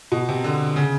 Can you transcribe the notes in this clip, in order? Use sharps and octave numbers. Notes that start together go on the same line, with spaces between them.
B2
C3
D3
C#3